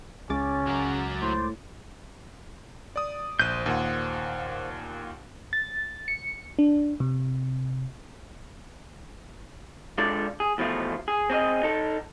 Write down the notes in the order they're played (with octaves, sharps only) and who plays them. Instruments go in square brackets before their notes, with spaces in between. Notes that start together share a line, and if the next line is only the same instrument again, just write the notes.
[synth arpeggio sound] C#2 D6 A6 [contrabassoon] C#3 [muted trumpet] C#4
[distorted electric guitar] F#3 A#4
[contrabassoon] A2 [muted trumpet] C5
[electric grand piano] D5 D#6
[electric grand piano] A#1 F#6 D#7 [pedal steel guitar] C5 G6
[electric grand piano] D#2 A#2 F#5
[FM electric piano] A6
C#7
D4
C3
[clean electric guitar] G#3 D4 F4 A4 D5
G#4
E2 B2 F3 A3 F4
G#4
C4 G#4 C#5 D#5
D#4 A4